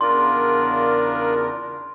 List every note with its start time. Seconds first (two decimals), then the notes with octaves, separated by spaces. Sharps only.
0.01 E2 C#3 D4 F4 A#4 D5 C6